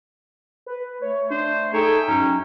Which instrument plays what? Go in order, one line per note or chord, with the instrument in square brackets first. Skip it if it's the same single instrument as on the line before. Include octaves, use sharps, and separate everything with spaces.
[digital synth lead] B4
[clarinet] A3 [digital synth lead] C#5
[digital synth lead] D4 [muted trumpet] C5
[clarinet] D#4 [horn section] G#4 E5 G5 [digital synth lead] A4 [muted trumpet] C#5
[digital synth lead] F#2 [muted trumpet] C#4 [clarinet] D#4